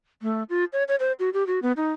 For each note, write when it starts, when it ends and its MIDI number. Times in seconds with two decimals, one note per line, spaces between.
0.22 0.43 57
0.49 0.64 65
0.73 0.84 73
0.88 0.96 73
1.00 1.12 72
1.19 1.30 66
1.33 1.46 67
1.47 1.59 66
1.62 1.72 59
1.77 1.92 63